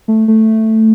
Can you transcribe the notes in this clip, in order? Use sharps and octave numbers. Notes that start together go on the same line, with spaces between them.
A3
A3